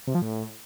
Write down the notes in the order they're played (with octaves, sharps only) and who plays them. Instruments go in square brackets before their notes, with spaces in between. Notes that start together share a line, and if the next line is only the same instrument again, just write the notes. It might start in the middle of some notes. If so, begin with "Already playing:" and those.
[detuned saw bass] C3
F3
A2